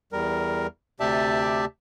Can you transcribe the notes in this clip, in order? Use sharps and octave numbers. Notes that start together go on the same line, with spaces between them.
E2 G3 A#4
D2 C3 G4 D5 E5 A5